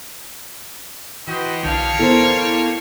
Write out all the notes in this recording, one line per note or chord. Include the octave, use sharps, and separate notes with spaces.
E3 F#4 G4 B4 C5 D#5
B1 D3 G3 A#3 C#5 F5 A5
B3 E4 A4 A#4 C5